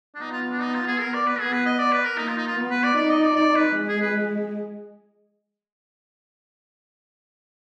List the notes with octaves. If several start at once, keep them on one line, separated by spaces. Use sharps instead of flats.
D4
B3 D#4
F4
D4
D#4
F4
G#4
A#4
D5
B4
B3 G#4
B4
D#5
D5
B4
A#4
A#3 D#4
F4
D#4
F4
B3
B4
D5
D#4 D5
D#5
D5
D5
B4
G#3
G#4
B4